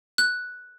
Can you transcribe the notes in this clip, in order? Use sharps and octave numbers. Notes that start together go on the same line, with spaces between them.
F#6